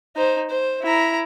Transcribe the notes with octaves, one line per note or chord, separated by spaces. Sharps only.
D#4 C5
C5
E4 A#5